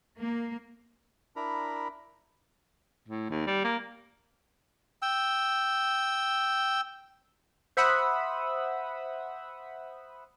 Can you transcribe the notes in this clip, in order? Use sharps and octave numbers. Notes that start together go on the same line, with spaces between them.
A#3
D4 E4 A#4 A#5 B5
A2
D#2
G3
A#3
G5 E6
C5 E5 F#5 B5 D#6 E6